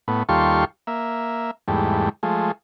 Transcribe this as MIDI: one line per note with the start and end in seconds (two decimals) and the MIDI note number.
0.08 0.23 45
0.08 0.23 59
0.29 0.65 39
0.29 0.65 55
0.29 0.65 65
0.29 0.65 69
0.29 0.65 84
0.29 0.65 85
0.87 1.51 58
0.87 1.51 76
1.68 2.09 40
1.68 2.09 44
1.68 2.09 55
1.68 2.09 57
2.23 2.52 53
2.23 2.52 56
2.23 2.52 57